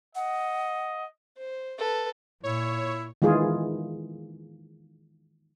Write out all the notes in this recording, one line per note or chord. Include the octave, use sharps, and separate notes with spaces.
D#5 F#5
C5
A4 B4
A#2 E4 C#5
D#3 E3 G#3 F4 G#4